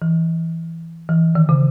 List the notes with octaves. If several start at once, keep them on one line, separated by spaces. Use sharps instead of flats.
E3
E3
D#3
C#3